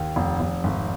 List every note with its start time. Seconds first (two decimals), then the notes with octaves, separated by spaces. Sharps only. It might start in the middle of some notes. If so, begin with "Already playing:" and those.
Already playing: D#2
0.16 F1
0.40 F1
0.64 G#1